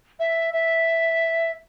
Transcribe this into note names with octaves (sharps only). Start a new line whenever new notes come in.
E5
E5